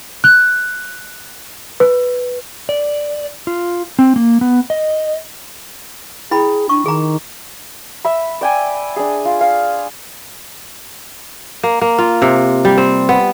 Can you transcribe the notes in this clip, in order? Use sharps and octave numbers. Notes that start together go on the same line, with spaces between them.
F#6
B4
D5
F4
C4
A#3
B3
D#5
E4 G#4 G5 B5
D4 C#6
D#3 G#4 A#5
E5 B5
D5 G5 G#5
D4 G#4
F4
F5
A#3
A#3
F4
C3
G3
C4
B3